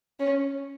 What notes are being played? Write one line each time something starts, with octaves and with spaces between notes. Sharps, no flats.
C#4